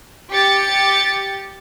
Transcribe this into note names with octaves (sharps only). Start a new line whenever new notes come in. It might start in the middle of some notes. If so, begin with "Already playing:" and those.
G4 A6 C#7